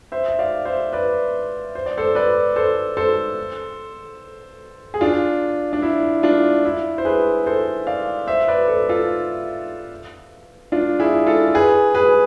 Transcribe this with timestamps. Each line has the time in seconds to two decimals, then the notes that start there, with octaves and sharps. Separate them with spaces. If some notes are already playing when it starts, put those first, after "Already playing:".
0.12 C5 E5
0.28 E5
0.39 D5 F5
0.65 C5 E5
0.93 B4 D5
1.75 C5
1.86 D5
1.98 A4 C5
2.15 B4 D5
2.56 A4 C5
2.97 A4 C5
4.94 G#4
5.01 D4 F4
5.73 D4
5.82 E4
6.23 D4 F4
6.65 E4
6.98 C5
7.05 G#4 B4
7.46 A4 C5
7.87 D5 F5
8.27 C5 E5
8.48 B4 D5
8.68 A4 C5
8.89 F4 A4
10.72 D4 F4
11.00 E4 G#4
11.26 F4 A4
11.54 G#4 B4
11.95 G#4 B4